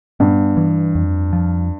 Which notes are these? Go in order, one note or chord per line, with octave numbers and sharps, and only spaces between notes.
G2 B3
E3
F2
F3